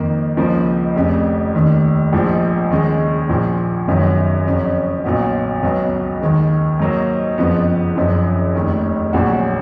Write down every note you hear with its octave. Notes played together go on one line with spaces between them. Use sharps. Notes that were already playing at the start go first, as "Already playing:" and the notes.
Already playing: F2 D#3 A#3
C#2 C#3 F3 A#3 D#4
F1 F2 C#3
F1 D#2 D#3
A#1 G#2 F3
D#2 C#3 G#3
A#1 A#2 F3
G#1 F#2 D#3 F#3 B3
F2 C#3 F#3 C#4
B1 A#2 F#3 B3 F#4
C#2 B2 F#3 B3
D#2 D#3 G#3
G#2 F#3 A#3 D#4
F#1 F2 C#3 F3 B3
F#1 F#2 F3
F1 D#2 D#3
A#1 A#2 F#3 C#4 F#4